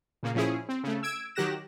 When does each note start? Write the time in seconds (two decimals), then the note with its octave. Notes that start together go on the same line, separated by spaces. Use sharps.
0.23 A#2 C#3 A#3
0.35 A#2 F3 C#4 E4 G#4
0.69 C4
0.83 C#3 A3
1.03 E6 G#6 D7
1.35 D#3 F#3 G4 F#6 A#6 E7